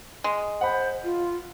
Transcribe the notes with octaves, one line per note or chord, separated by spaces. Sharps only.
G#3
C5 F#5 B5
F4